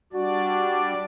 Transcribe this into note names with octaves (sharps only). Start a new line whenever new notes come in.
G3 D4 F#4 D5